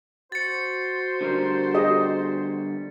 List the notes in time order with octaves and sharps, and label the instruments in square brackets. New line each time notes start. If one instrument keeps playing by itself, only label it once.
[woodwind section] F#4 C5 [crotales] A6 C#7
[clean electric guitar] D3 G3 A#4
[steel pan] G4 G#4 D#5